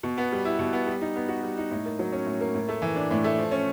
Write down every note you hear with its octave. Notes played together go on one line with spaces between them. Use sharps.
B2
B3
G3
E4
B2
B3
G3
D#4
B3
F#4
G3
D#4
A2
A#3
F#3
C#4
A2
A#3
A2
A3
E3
D4
A2
A3
F3
C#4